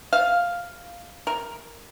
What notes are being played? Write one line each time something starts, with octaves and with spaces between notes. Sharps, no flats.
F5
A#4